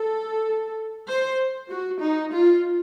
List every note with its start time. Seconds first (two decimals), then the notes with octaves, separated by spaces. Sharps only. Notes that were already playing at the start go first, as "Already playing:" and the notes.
Already playing: A4
1.08 C5
1.71 F#4
2.02 D#4
2.33 F4